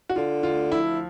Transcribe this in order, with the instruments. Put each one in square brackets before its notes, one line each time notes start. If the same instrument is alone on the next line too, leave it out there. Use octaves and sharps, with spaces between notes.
[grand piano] F#4
[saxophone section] D3 [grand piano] F4
[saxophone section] D2 [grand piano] F4
[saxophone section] F3 [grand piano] E4